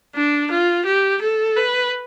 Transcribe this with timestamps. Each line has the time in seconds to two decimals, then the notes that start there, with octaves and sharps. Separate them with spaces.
0.15 D4
0.50 F4
0.85 G4
1.21 A4
1.56 B4